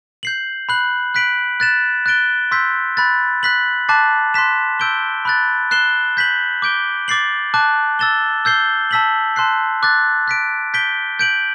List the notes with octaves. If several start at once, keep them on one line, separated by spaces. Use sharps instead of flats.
G6 C7 F#7
B5 F#6 C7 F#7
F#6 B6 D7 F#7
F#6 A6 E7
F#6 A6 D7 G7
C6 E6 G6 B6
B5 F#6 A6
F#6 B6 F#7
A5 D6 F#6 A6 C7
C6 F#6 B6 E7
E6 G6 D7 G7
B5 F#6 A6
F#6 C7 E7 G7
G6 B6 F#7
D6 G6 D7 G7
D6 A6 C7 F#7
A5 D6 F#6
E6 A6 E7 G7
E6 G6 C7 G7
A5 E6 B6 F#7
A5 C6 F#6 C7
D6 F#6 A6
F#6 B6 D7
G6 B6 D7 G7
G6 D7 F#7